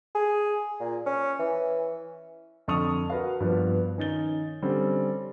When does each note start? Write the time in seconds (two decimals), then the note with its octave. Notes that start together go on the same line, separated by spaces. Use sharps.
0.15 G#4
0.80 A#2
1.06 C#4
1.39 E3
2.68 F2 D3 A5 C#6 D#6 F7
3.10 F#4 A#4 B4 F5
3.40 G2 F3 B3
3.97 D#3 C#4 D#4 A6 G7
4.62 D3 G3 C4 C#4